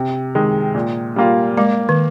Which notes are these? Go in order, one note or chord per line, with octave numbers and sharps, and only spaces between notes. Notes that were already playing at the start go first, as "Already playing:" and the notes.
Already playing: C3
D#3 G#3
A#2
G3 A#3 F4
G#3 A#3
D#3